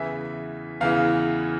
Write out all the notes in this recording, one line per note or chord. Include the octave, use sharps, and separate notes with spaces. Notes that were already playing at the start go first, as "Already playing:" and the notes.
Already playing: E2 C#3 E3 E5
E2 C#3 E3 F5